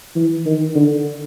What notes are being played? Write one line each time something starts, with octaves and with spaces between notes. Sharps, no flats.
E3
D#3
D3